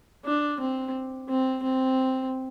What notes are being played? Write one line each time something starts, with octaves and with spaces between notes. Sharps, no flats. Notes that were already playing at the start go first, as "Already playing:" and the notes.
D4
C4
C4
C4